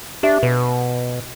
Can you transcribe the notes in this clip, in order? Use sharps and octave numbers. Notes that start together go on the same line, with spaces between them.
D4 G4 E5
B2 B4